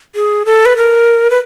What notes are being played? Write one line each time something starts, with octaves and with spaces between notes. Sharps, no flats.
G#4
A4
B4
A#4
B4